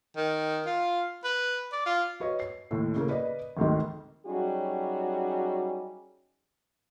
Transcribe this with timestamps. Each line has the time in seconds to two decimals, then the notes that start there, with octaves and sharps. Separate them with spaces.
0.16 D#3
0.66 F4
1.24 B4
1.72 D5
1.86 F4
2.20 F#4 B4 C#5 D#5
2.40 C7
2.71 D#2 A2
2.96 C#3 A#3
3.09 B4 D5 D#5
3.57 G#1 D2 G#2 D#3
4.26 F#3 G3 C#4 D#4 F#4 G#4